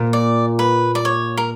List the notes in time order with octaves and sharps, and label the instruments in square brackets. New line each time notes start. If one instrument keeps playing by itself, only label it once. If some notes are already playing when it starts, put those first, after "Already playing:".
Already playing: [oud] A#2
[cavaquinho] D5
B4
D5
C#5
A#4